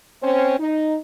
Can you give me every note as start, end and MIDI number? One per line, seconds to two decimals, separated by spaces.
0.23 0.59 60
0.23 0.59 61
0.23 0.59 72
0.60 0.97 63